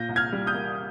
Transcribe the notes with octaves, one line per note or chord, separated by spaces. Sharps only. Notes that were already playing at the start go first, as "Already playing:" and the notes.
Already playing: A#2 G6 A#6
C2
F6 G#6
G3
D#6 G6
A#3